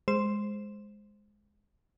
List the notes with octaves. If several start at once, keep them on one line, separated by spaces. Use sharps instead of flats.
G#3 C5 C6 E7